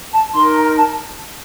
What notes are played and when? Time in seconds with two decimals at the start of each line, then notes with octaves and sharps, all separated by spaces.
0.13 A5
0.34 D#4 A#4 C6
0.54 A#5
0.76 A5